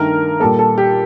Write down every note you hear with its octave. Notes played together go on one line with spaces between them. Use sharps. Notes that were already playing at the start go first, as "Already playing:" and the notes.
Already playing: G2 D#3 A3 A#4
A#2 G3 A#3 A4
A4
G4